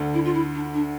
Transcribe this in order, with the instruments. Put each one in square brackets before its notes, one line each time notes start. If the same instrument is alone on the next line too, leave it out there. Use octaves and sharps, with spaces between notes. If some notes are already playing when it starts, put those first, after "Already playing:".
Already playing: [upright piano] D2 D3
[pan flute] E4
F4
E4
D4
D4